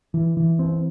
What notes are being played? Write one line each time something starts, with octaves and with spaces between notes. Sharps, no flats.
E3
E3
C4